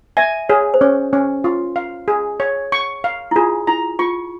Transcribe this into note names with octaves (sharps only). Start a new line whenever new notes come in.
E5 G#5
G#4 C#5
C5
C#4 C#5
C#4
F4
F5
G#4
C#5
C#6
F5
E4
F4 G#4
E4 A#5
F4 C#6